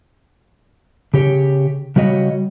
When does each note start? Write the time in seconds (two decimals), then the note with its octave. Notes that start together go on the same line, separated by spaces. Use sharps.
1.14 C#3 G4 C#5
1.96 C#3 G3 F#4 C#5 D#5